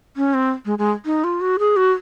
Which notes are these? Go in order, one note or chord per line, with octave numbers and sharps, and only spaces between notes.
C#4
C4
G#3
G#3
D#4
F4
F#4
G#4
F#4